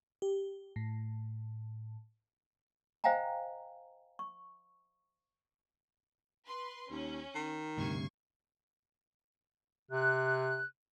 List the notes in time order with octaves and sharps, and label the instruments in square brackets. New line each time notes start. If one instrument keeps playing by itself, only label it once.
[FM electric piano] G4
A2
[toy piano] C5 D#5 F5 G5 G#5 A#5
C#6
[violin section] B4 C6
[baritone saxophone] D#2 [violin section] C#4
[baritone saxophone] D#3
[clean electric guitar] D2 G2 C3 [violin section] C#6 G#6 C7
[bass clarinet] C3 [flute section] F#6